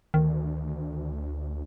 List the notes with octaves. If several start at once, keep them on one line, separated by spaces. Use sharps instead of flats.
D2 D#3